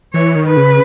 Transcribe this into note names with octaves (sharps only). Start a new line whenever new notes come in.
E3 C#5
D#3
B4
C#3